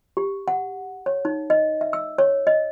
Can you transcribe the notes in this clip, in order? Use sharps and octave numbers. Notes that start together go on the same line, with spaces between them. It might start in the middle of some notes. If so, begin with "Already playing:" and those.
G4
F#5
C#5
D#4
D#5
E5
E6
C#5
D#5